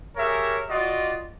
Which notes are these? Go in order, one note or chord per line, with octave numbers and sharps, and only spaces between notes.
G4 G#4 A#4 C#5 E5
F4 F#4 D5 D#5